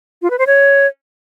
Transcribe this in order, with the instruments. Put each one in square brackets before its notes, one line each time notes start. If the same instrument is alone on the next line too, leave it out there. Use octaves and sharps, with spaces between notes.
[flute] F4
B4
C5
C#5